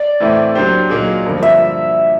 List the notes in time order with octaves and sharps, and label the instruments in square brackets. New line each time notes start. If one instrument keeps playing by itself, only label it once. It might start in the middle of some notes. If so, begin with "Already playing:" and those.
Already playing: [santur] D5
[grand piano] A2 E3 A3 C4 E4
F#3 A#3 D4 G4 C5
A#2 F#3 A#3 D#4 G#4
G2 D3 F3 A#3
[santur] E5